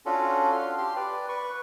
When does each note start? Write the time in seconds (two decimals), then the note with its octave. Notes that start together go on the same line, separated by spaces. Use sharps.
0.06 C#4 D4 F4 F#4 A4
0.52 F5 C6
0.77 G4 C6
0.96 B4 D5
1.29 B4 C#6